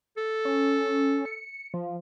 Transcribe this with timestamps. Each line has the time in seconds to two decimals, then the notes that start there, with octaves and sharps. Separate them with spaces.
0.17 A4
0.45 C#4
1.25 C#7
1.74 F3